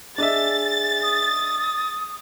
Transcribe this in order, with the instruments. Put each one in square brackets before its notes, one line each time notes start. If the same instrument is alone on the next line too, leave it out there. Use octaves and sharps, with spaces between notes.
[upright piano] D4 D#5 E5 [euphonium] G#4 [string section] A6
[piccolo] D#6